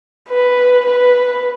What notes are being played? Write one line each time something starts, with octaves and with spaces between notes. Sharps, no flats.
B4
B4